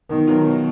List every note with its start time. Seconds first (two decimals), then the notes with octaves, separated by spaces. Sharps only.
0.09 B2 D#3
0.27 F#3 B3 F4 A#4
0.45 B2